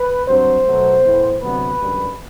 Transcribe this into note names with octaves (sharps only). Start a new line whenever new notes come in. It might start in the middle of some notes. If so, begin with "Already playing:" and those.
Already playing: B4
G2 F#3 C4 C5
B2 F#3 A3
A2 E3 B3
D2 C3 F#3 B3 B4
F#2 D3 G3